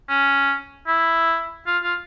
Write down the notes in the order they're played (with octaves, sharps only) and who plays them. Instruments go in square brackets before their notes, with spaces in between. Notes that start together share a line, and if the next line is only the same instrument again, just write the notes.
[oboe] C#4
E4
F4
F4